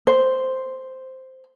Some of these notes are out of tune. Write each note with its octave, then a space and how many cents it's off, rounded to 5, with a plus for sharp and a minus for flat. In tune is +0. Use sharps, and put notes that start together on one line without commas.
C5 -5